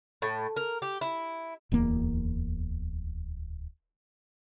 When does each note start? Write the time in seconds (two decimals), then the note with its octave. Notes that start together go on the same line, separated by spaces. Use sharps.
0.22 A2
0.56 A#4
0.82 G4
1.01 E4
1.72 D1 E2 A#3